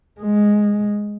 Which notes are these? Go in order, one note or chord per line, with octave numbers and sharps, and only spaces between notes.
G#3